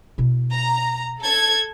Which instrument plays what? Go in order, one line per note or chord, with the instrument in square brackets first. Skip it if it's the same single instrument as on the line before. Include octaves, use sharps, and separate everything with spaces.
[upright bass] B2 E4
[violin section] A#5
A4 G#6